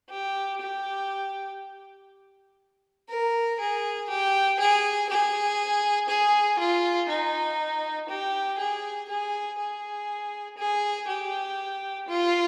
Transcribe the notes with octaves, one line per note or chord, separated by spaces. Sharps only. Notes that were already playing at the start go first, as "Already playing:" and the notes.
G4
G4
A#4
G#4
G4
G#4
G#4
G#4
F4
D#4
G4
G#4
G#4
G#4
G#4
G4
F4